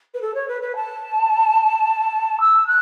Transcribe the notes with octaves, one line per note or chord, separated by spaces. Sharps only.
B4
A4
C#5
B4
B4
A5
E6
F#6